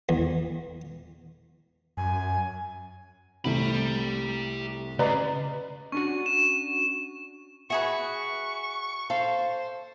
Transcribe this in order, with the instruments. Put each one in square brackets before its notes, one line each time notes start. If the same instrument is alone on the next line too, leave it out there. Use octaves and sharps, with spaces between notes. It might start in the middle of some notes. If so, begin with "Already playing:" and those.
[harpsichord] E2
[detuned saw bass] F#2 [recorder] G#5
[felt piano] C2 C3 A3 [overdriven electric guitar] G4 B5
[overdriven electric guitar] C#3 [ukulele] B4 D5 A#5 [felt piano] D#5
[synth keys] C#4 D4 F#4 [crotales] C#6
[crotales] E7
[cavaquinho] F#4 G#4 B4 [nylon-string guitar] E5 [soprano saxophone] C#6
[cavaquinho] A4 [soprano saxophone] C5 [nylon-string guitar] F5